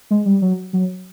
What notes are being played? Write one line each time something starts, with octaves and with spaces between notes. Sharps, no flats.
G#3
G3
F#3
F#3